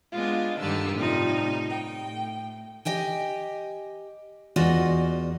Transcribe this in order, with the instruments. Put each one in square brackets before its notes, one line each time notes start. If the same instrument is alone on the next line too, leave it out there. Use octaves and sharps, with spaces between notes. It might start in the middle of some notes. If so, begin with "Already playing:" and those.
[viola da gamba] G#3 B3 D4 [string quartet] F4 D#5
[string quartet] G2 D4 E6 [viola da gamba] D3 D#3 G4
[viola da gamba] A2 D#4 [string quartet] C3 F3 G3
[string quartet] G5
[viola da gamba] A2
[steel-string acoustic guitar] G4 D#5 G5 G#5
E2 F4 F#4 D5 D#5